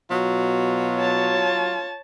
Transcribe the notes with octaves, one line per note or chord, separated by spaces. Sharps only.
B2 F#3 F4
C#5 A5